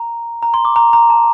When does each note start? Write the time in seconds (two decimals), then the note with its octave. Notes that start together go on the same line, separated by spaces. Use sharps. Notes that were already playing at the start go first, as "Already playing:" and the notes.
Already playing: A#5
0.43 A#5
0.54 C6
0.65 D6
0.76 A#5
0.93 A#5
1.10 A5